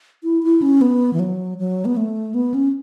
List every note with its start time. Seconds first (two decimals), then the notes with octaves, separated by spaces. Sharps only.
0.23 E4
0.43 E4
0.62 C#4
0.81 B3
1.13 E3
1.19 F#3
1.59 F#3
1.85 B3
1.97 A3
2.34 B3
2.54 C#4